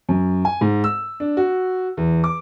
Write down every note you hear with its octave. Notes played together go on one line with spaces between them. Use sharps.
F#2
G#5
G#2
E6
D4
F#4
E2
D6